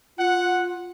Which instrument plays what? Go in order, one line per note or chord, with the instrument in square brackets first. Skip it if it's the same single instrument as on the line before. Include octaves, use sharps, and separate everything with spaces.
[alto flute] F4 [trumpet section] F#5